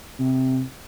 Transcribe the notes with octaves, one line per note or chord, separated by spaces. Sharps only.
C3